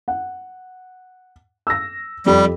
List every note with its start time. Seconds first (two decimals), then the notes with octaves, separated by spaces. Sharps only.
0.08 F#5
1.67 E6 A#6
2.26 F2 G3 G4 B5